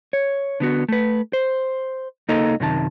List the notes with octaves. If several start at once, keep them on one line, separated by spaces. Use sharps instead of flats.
C#5
D3 B3 F#4
A3 B4
C5
C#2 A#3 D#4 A4 D#5 A#5
F#2 C3 D#3 A5